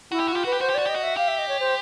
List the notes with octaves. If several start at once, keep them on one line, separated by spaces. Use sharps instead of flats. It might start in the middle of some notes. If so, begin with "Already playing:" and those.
E4 F#4
G4
F#4
F4 G4
F#4 B4
G4
F#4 C5
G4
F#4 D5
G4 D#5
F#4
E5
G4 F5
E5
D#5
C#5
C5